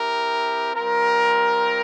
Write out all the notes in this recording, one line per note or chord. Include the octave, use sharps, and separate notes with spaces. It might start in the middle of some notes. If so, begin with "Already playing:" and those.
Already playing: C4 E4 G4 A#4
G3 C4 F4 A#4